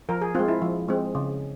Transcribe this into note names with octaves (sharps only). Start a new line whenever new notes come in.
F3 A#4
G#4
G#3 C4 F4
E4
F3
G#3 C4
C#3